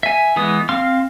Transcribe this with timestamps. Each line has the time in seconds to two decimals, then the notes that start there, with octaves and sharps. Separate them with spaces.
0.03 E5 G#5
0.36 E3 G#3 B3 D#6
0.69 C4 F5 C6 F6